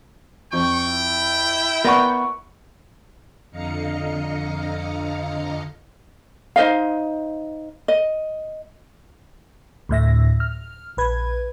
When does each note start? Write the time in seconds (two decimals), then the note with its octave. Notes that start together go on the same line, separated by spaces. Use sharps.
0.53 F2 G5 C#6
0.90 E4
1.85 B3 A#4 B4 D5 F#5 C#6
3.51 F2 D3 D#5 F5 A#5 C#7
6.56 D#4 C5 D#5 F5
7.88 D#5
9.89 D2 A2 E5 A#6
10.40 F6
10.97 A#1 B4 G#6